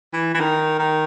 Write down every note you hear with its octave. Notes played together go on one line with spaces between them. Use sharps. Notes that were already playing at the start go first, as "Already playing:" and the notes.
E3
E3
D#3
D#3